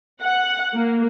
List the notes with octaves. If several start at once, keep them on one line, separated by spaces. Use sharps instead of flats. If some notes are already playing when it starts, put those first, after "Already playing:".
F#5
A#3